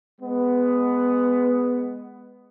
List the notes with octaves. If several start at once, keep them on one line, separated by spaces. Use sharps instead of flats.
G#3 B3